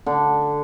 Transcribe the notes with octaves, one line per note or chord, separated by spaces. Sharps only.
D3